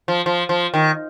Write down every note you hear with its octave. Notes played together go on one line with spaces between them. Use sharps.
F3
F3
F3
D#3